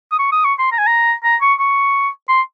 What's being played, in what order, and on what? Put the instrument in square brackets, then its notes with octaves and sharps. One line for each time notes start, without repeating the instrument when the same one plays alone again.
[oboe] D#6
C#6
D#6
C#6
C6
A#5
G#5
A#5
A#5
C#6
C#6
C6